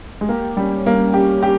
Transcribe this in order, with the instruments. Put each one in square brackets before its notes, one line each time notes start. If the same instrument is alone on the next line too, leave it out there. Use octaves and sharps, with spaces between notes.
[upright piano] G#3
[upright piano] A#3 [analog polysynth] G4
[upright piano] G3 [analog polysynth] C#4
[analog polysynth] G3 [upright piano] A#3
[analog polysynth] C#4 [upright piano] G4
[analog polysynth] C#4 [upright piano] G4